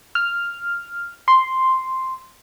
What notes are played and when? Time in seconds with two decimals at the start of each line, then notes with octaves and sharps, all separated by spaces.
0.15 F6
1.28 C6